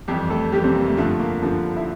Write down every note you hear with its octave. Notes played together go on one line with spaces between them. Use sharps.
F2 E3 G3 G4
A3 A4
F2 E3 G3 G4
C3 C4
A#3
A3
G2 D3 F3 A3
A#3
G2 D3 F3
E4